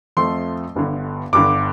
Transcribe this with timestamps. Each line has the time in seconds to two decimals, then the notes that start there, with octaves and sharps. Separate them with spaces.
0.17 F2 F3 A3 C6
0.75 G1 G2 D3
1.33 G1 G2 D3 D6